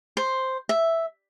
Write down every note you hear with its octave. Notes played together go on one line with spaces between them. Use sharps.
C5
E5